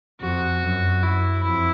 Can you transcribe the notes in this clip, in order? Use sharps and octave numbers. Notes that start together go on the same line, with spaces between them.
F2 F#4
F#2
F#2 E4
F2 E4